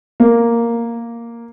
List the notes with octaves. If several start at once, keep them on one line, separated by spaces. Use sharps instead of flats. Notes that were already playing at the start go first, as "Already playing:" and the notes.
A#3